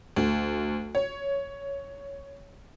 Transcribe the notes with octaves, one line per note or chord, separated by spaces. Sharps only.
D2
C#5